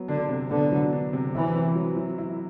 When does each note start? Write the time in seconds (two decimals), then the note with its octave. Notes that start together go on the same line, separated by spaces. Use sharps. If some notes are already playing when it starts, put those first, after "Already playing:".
Already playing: F#3 B3
0.08 D3 D4
0.29 C3
0.51 D3 B3
0.71 F#3
0.93 D4
1.13 C3
1.34 E3 E4
1.55 C4
1.75 F#3
1.96 F#3
2.18 E4